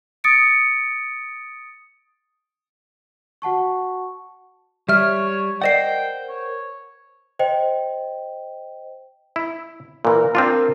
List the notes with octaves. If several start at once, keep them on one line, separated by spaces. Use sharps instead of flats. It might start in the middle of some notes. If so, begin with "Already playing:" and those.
D#6 A6 C#7 D7
F#4 F#5 A5 C#6
G3 C#5 E5 F6
A#4 C5 D5 D#5 F#5 G5 C7
C#5
C5 D#5 G5
E4
A#2 E3 A#4
C4 D4 F4